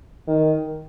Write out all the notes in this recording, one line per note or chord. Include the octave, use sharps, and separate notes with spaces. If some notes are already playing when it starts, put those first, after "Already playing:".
D#3